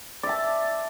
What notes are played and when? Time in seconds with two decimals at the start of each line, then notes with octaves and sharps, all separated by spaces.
0.23 D5
0.26 E5
0.29 A5